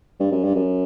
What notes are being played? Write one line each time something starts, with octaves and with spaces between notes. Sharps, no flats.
G2
F#2
G2
F#2